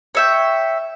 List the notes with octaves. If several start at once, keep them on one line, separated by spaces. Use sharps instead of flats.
C#5 E5 G5